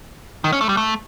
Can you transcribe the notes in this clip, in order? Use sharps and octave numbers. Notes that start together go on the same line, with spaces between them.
D#3
C#4
A3
G3
A3